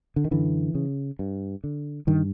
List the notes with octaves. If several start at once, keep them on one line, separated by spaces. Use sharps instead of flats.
D3
D#3
F#2 D3 E3
C#3
G2
D3
G2 D#3